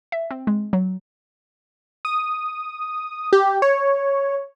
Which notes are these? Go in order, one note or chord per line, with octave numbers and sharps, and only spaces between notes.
E5
C4
G#3
F#3
D#6
G4
C#5